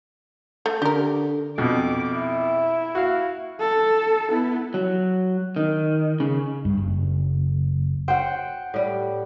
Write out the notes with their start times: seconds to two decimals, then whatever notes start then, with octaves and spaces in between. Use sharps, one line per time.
0.66 A3
0.82 D3 G4 A#4
1.58 F2 B2 D6
2.18 E4
2.95 F#4 F5
3.60 A4
4.28 B3 E4
4.74 F#3
5.56 D#3
6.20 C#3
6.65 G2
6.78 F#1
8.08 C5 F#5 G5
8.74 A2 G3